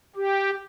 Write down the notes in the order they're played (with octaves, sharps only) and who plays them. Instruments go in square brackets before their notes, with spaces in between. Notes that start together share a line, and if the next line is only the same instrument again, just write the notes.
[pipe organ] G4